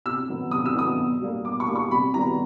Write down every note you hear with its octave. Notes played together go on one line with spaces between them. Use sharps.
C3 E6
D#3 F#3 B3
C3 D#6
E6
D#3 F#3 B3 D#6
B2
G3 A#3
B2 D6
C#6
G3 A#3
C#6
C3 B5
D#3 G3 B3 A#5